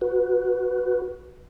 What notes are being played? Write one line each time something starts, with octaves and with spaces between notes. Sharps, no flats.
F#4 B4